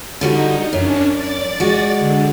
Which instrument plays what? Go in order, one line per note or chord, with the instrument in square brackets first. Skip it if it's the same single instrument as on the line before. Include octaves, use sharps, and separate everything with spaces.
[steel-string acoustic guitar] D3 G3 F#4 [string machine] D#4
[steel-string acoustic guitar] F#2 [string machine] C#4 D4
[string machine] D5 A6
[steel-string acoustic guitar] G#3 F#4
[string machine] D3